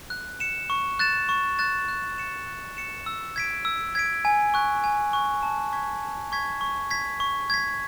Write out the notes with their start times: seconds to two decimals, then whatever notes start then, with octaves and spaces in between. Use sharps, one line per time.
0.10 F#6
0.40 C#7 E7
0.70 C#6
0.99 F#6 A6 E7
1.29 C#6
1.59 F#6 A6 E7
1.88 F#6
2.18 C#7 E7
2.47 F#6
2.77 C#7 E7
3.06 E6
3.36 G#6 B6 D7
3.65 E6
3.95 G#6 B6 D7
4.25 G#5
4.54 C#6 F#6
4.84 G#5
5.13 C#6 F#6
5.43 A5
5.73 C#6 G#6 B6
6.02 A5
6.32 C#6 G#6 B6
6.61 C#6
6.90 G#6 B6
7.20 C#6
7.50 G#6 B6